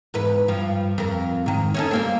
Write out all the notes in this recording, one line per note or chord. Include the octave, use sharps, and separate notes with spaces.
E2 G#2 B4
G2 F3
F2 A#4
G#2 D#3
C#4 D#4 A4
G3 A#3 C4